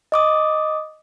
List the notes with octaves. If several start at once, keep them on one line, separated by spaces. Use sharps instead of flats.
D#5 D6 D#6